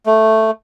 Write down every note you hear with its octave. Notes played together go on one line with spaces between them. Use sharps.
A3